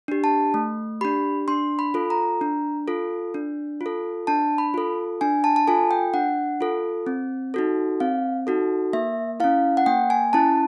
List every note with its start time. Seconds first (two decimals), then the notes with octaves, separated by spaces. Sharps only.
0.08 D4 G4
0.24 A5
0.54 A3
1.01 D4 G4 B5
1.48 D4 C6
1.79 B5
1.94 F4 A4
2.10 A#5
2.41 D4
2.88 F4 A4
3.34 D4
3.81 F4
3.86 A4
4.27 D4 A5
4.58 B5
4.74 F4 A4
5.21 D4 G#5
5.44 A5
5.56 A5
5.67 F4 A4 G#5
5.91 G5
6.14 D4 F#5
6.61 F4 A4
7.07 C4
7.54 D#4 F#4 A4
8.00 C4 F5
8.47 D#4 F#4 A4
8.93 A#3 E5
9.40 C#4 E4 F5
9.77 F#5
9.86 A#3 G5
10.10 G#5
10.33 C#4 E4 A5